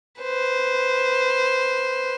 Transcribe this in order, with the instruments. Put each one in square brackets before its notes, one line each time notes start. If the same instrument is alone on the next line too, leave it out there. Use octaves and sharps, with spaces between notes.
[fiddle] B4 C5